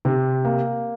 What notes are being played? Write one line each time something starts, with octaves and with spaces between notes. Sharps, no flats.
C3
A#3